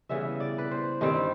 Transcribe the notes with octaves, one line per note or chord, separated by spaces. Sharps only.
C#3 E3 G3 B3 E5
D5
B4
C5
G2 D#3 G3 C4